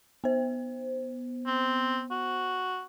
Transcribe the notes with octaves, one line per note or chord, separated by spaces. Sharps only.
B3 C5
C4
F#4